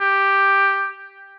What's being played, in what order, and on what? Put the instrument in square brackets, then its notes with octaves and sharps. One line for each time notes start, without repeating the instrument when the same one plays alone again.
[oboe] G4